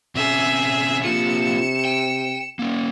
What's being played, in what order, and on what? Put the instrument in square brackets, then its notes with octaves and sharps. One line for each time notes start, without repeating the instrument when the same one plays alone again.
[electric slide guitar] B2 C4 C#4 [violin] G#4 E5
[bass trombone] C3 [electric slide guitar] A#3 D4 F4 [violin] C#7 E7
[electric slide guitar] G5
A#3 C#4